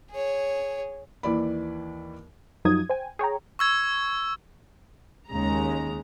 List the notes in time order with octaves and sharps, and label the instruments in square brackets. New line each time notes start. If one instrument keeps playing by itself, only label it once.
[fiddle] G#4 C#5
[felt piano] D#2 E3 D5 B5
[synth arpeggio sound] F#2 F3 F#3 D#4 D#6 G#6
C5 G5 G#5
G#4 C#5 G5 A#5
[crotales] C#6 E6 G#6
[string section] D#2 C#3 G#3 A#5